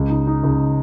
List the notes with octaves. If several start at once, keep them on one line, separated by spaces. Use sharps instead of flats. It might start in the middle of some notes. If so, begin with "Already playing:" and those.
Already playing: C#2
D#4
D#4
C#2